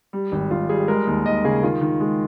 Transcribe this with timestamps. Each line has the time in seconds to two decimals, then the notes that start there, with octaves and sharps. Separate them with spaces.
0.13 G3
0.32 G#1
0.51 G#1 F4
0.69 G3 G#4
0.88 G#3 A#4
1.07 D#2
1.25 D#2 D#5
1.44 C#3 G#4
1.63 D#3 F4
1.81 D#3
2.00 G#3